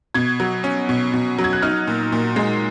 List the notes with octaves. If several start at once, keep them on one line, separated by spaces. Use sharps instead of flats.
B2 G#6
F#3
C#4
B2
B2
F#3
G#6
F#6
D#4 F6
A#2
A#2
G#3